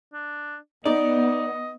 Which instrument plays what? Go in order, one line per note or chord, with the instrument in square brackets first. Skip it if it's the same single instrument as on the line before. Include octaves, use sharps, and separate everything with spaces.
[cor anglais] D4
[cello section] B3 [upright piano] D#4 [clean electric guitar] D5 [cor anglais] D#5